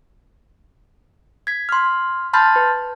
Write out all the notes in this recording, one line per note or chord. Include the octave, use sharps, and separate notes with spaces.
G#6 B6
C6 F6
A5 B5 C6 F6 G6 A6
B4